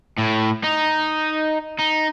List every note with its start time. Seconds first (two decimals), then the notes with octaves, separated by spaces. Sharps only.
0.18 A2
0.63 D#4
1.79 D#4